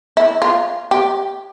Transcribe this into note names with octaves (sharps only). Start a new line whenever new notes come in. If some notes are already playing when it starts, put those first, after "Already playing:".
E4
F4
G4